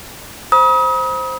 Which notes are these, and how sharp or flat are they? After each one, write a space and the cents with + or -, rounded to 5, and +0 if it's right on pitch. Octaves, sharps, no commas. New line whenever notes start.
C5 +0 B5 -40 D#6 +35